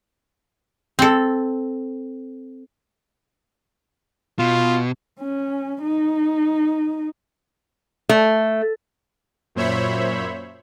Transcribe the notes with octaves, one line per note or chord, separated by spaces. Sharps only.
C4 A4
B2 F4
C#4
D#4
A3
F#2 A#2 C5 C#5 E5 B5